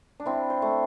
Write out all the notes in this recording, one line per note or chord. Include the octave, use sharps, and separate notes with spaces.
D4
C4 E4
C5
A3